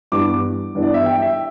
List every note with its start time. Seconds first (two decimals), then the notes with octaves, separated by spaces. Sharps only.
0.12 G2 E3 B3 D4 D6
0.75 G2 E3 B3 D4
0.82 D5
0.94 E5
1.06 G5
1.22 E5